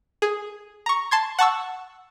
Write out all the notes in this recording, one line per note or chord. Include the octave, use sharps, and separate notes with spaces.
G#4
A#5 C#6
A5 C6 G#6
F#5 A5 C#6 E6